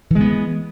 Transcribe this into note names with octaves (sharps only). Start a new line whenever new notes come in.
E3 G#3 B3